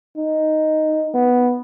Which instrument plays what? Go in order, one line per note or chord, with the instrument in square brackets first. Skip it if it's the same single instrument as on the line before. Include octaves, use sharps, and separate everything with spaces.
[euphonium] D#4
B3